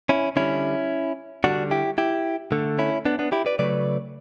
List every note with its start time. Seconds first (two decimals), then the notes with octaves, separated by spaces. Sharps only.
0.09 C#4 E4
0.36 D3 G3 C#4 E4
1.44 D3 G3 D4 F#4
1.71 E4 G4
1.98 E4 G4
2.52 D3 A3
2.79 C#4 E4
3.05 B3 D4
3.19 B3 D4
3.32 E4 G4
3.46 B4 D5
3.59 C#3 F#3 A3 B4 D5